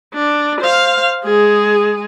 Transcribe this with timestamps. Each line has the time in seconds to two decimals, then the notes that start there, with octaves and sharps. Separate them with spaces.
0.14 D4
0.61 C5 F5
1.24 G#3 G#4